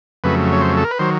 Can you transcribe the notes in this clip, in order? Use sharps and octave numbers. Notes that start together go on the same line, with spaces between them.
F2 C#3 F#3 A3 B4
C#5
C5
A4
A#4
B4
D#3 F#3 C5